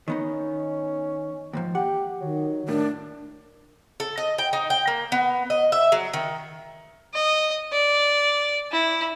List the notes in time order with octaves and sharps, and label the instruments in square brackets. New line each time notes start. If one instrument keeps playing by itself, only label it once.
[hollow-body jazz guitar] D#3 B3 D#4 [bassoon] C#4
[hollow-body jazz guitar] D#2 G#2 F3
[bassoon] G4 [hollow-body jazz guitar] F#5
[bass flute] D#3 [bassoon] F#3
[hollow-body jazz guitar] A2 [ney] D4 [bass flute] A#4
[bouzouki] A4
D#5
G5
D#4
G5
A#3
B3
D#5
E5
F#3
D#3
[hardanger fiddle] D#5
D5
E4